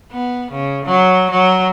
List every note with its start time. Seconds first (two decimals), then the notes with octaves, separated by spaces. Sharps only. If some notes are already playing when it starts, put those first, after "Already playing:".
0.12 B3
0.52 C#3
0.85 F#3
1.31 F#3